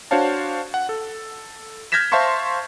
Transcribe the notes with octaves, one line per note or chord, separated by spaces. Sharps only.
D4 F#4 C5 C#5 F5 A5
F#5
A4
F6 G6 G#6 A#6 B6 E7
C5 E5 F5 A5 C6 C#6